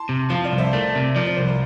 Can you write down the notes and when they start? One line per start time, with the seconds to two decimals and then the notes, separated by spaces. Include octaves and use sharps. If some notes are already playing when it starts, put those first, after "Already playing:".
Already playing: A5 C6
0.09 C3
0.29 F3 F5 A5
0.44 D5 F5
0.52 C2
0.58 C5 E5
0.72 A3 A#4 D5
0.95 C3
1.16 F3 A#4 D5
1.26 C5
1.37 C2 C5
1.48 A#4